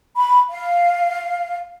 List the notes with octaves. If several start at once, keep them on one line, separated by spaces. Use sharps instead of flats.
B5
F5